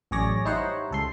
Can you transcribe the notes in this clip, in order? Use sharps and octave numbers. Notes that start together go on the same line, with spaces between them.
A1 F#2 G#4 C#5 D5 A#6
G3 D#4 E4 C5 C#5 F#5
C#2 A4 C6